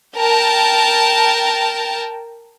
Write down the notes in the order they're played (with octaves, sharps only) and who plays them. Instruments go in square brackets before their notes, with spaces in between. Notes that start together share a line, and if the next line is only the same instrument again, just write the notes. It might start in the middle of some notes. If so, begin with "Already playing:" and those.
[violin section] A#4 G5 A5